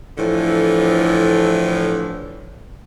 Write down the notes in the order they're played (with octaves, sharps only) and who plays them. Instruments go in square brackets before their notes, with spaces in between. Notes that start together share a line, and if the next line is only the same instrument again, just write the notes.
[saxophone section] A2 D3 E3 F3